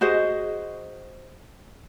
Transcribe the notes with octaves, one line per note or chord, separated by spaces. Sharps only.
F#4 G#4 C5 D#5